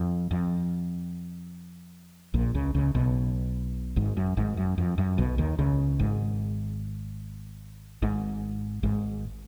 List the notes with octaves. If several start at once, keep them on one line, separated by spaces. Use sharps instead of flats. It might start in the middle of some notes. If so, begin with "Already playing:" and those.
Already playing: F2
F2
A#1 A#2
C#2 C#3
C#2 C#3
B1 B2
G#1 G#2
F#2
G#1 G#2
F#2
F2
F#2
B1 B2
D#2 D#3
C#2 C#3
G#1 G#2
G#1 G#2
G#1 G#2